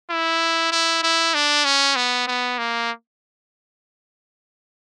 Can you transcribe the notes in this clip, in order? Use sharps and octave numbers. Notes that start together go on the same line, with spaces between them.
E4
E4
E4
D4
C#4
B3
B3
A#3